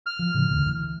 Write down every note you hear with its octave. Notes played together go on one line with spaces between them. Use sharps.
F6
F3
A2 C#3 F3
E1 D2
E3